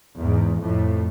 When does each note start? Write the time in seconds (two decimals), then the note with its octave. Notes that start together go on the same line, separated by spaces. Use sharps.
0.21 E2 G#2
0.61 F2 A2